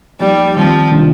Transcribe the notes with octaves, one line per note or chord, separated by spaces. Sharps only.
F3 G3 A#3 D#4 G4
D#3 F3 G3 C4
C3 D#3 A#3 D4 F4